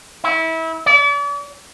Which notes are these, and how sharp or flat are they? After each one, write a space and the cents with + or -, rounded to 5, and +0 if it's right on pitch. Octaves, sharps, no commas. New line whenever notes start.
E4 -25
D5 -40